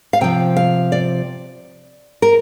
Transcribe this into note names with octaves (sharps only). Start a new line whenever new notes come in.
F5
C3 F3 G5
F5
D5
A#4